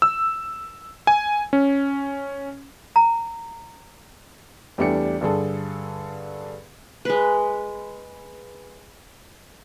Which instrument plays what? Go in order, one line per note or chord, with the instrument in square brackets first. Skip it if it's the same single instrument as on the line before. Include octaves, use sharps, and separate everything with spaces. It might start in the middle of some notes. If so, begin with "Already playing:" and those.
[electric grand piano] E6
G#5
C#4
[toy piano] A#5
[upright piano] E2 G3 A3 D4 G4 C#7
G2 D3 G#4 A4
[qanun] G#3 B4